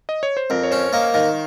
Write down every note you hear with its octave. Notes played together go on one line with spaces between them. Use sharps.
D#5
C#5
C5
F2 A#4
C#5
C#4 C5
A#3 D#5
D#3 F5